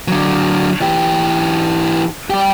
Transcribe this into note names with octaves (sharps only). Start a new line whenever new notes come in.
D3 F#3
E3 G4
G3 G4